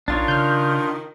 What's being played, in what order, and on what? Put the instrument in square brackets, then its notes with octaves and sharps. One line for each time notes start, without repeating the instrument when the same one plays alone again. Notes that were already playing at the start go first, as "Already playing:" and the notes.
[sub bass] A#1 [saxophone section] D#3 [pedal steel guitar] D4 F4 C#5 [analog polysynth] A6
[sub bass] C#3 [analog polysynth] F6 G6